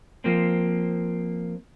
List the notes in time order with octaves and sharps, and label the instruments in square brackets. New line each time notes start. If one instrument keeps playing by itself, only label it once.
[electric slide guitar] F3 A#3 C4